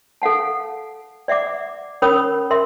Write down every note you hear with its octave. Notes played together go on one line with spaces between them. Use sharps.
A4 F5 F#5 A5
D5 E5 F#5 D6
C#4 A#4 C#5 B5 D#6
A#4 E5 C6